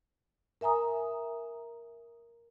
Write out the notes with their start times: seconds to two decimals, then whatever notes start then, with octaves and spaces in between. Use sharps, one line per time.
0.61 A#4 E5 G#5 A#5 D#6